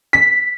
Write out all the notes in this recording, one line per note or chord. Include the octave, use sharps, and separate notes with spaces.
B6